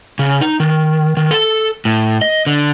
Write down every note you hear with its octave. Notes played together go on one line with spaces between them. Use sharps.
C#3
D#4
D#3
D#3
A4
A2
D#5
D3